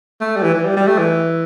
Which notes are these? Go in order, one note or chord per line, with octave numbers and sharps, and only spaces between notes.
A3
G3
E3
E3
G3
G3
A3
E3